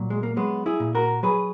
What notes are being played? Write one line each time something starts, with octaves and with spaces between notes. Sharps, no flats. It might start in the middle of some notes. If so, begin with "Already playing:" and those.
Already playing: A#2 F#3
G#3
A#3
F#3 G#3 B3
E4 G#4
A#2
F#4 A#4
F#3 G#4 B4